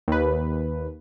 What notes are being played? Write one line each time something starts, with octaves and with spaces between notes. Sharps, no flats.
D#2 B4